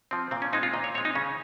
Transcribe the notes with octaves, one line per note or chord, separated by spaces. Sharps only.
F3 C4
A#2 C4
C#4
G#3 C4 D#4
F4
A#2 D#5
C#5
G#3 C4 C#5
D#4
C#3 C#4